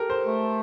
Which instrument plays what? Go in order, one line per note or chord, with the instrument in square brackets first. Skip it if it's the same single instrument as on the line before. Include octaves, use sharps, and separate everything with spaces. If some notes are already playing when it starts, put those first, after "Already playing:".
Already playing: [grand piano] G4 A4 A#4
C5
[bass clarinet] A3